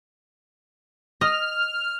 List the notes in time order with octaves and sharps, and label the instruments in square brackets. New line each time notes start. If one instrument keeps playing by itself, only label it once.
[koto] D#5 [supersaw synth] F6